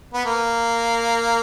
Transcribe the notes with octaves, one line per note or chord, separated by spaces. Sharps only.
B3
A#3